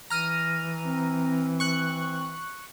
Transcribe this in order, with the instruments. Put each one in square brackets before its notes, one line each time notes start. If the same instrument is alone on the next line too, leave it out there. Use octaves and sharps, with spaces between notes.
[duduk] E3 [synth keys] A#5 F6 D#7
[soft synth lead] C4
[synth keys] C#6 F#6